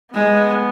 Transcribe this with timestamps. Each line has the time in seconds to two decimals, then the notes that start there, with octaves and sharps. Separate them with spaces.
0.14 G#3 B3